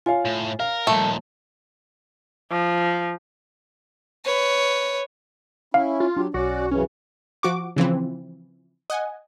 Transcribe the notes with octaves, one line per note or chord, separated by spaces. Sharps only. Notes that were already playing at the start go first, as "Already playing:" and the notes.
F4 C#5 F5 G#5
A2
A#4 F5
D#2 A#2 F3 G3 A3
F3
B4 C#5
C#4 E4 F5
F4
F#3 D4 G4
B1 C#4 F#4 D5
F#2 C#3 E3 C#4
F3 F#4 C#6 D6
C#3 E3 F3 C4
D#5 F#5 G#5